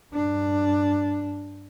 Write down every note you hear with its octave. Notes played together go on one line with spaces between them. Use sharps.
G2 D4